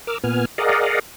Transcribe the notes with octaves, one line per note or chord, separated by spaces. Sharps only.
A#4 D6 E6 F6
A#2 B3 G#5 F6
G#4 A#4 D5 D#5 F5 F#5